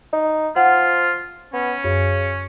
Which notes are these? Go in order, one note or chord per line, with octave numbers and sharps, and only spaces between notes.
D#4
F3 F4 F#5
B3 C#4
F#2 C#3